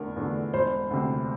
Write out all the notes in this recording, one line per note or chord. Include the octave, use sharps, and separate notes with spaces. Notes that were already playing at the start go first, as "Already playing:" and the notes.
Already playing: F1 E2 D3 D4 A#4
E2 D3 A3 D4
E1 C5
D2 C3